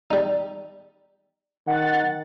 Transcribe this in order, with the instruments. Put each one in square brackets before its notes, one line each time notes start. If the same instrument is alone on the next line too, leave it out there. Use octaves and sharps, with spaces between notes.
[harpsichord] G3 D#4
[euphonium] D#3 [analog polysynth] F#5 A6